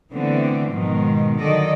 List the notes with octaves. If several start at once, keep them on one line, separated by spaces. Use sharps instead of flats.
D3 E3 A3 B3 C4
G#2 B2 D#3 F3 G#3
D3 D#3 F#3 A4 D5 D#5